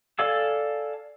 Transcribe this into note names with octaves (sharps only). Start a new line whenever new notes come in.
A4 D5 F5 G#5 E6